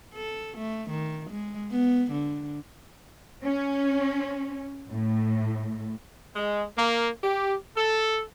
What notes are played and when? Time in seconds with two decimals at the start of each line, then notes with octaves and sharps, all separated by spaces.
0.14 A4
0.58 A3
0.90 D#3
1.30 G#3
1.71 B3
2.11 D3
3.44 C#4
4.90 A2
6.36 G#3
6.77 A#3
7.24 G4
7.77 A4